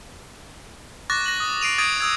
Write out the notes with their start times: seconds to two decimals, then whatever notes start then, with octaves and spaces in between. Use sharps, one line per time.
1.10 C#6 D6 F#6 A6 A#6
1.26 A#6 F#7
1.40 D#6
1.61 C7 D7 D#7 F7
1.78 D#6 G#6 A6 D7 D#7
1.99 D#6 E6 G#6 D7